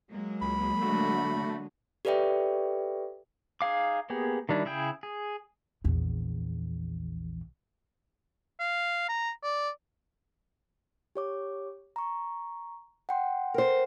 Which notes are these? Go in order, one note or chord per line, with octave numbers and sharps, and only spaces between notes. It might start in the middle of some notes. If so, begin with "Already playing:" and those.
F#3 G#3 A#3
C#2 B5
D3 A3 F#4
G4 A4 B4 D5 E5 G5
D#4 G#4 F5 D6
A#3 B3 G4 G#4
D#3 G3 D4 E4
C#3 E4 G#4 G5
G#4
A#1 E2
F5
A#5
D5
G4 C#5 D6
A#5 C#6
F#5 G5 C6
A#4 C5